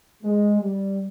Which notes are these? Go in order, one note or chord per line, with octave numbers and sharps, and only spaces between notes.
G#3
G3